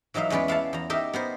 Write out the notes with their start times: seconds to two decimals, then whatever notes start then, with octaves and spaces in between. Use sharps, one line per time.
0.14 E3 F#3 D#4 E5 F5
0.30 E2 G#3 C#4 B4 D5
0.48 E4 F5 F#5 A5
0.73 E2 A#5
0.90 D#4 G4 A#4 D#5 E5
1.13 B3 A#4 C5